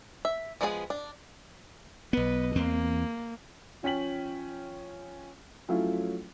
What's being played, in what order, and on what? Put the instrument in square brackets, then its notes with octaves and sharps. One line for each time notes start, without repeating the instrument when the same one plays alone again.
[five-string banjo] E5
F3 G#3 B3 F4 G#4
D4
[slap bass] B1 B3 [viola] B4 D#5
[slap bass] E2 C4 [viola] A#3
[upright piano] F3 C#4 G5 B6 F#7
F3 F#3 A3 C#4 E4 F4